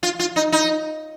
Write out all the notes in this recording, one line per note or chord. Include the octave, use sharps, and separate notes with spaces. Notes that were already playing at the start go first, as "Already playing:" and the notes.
F4
F4
D#4
D#4